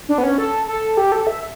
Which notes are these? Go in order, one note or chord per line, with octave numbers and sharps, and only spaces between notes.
D4
B3
C#4
A4
A4
G4
A4
E5